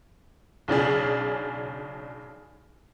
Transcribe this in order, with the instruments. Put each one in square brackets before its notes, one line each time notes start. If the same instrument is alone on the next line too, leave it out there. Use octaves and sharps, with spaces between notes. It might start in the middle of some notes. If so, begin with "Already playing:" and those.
[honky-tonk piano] B1 C#3 D4 G#4